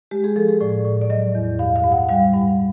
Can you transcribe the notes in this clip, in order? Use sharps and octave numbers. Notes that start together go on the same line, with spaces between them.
G#3 G4
G#4
F3 A4
G#4
A2 D5
A2
D5
F#3 D#5
E2
G2 F5
F5
G2
F#5
G3 F5
G2